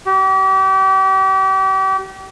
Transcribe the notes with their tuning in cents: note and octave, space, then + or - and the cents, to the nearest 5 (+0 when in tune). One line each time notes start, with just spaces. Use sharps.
G4 -35